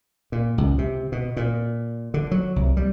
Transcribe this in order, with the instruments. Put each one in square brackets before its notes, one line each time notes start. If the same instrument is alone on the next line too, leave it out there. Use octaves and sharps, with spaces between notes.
[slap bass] A#2
C#2
C3
B2
A#2
D3
F#3
C2
G3